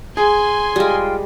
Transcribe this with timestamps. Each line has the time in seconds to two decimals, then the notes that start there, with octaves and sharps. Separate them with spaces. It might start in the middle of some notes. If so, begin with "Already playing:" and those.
0.17 G#4 G#5 C6
0.76 G3 G#3 F4 G5